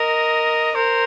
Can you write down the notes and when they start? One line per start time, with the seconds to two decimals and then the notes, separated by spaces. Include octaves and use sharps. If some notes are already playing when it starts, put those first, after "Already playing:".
Already playing: A#4 D#5
0.75 A#4 C5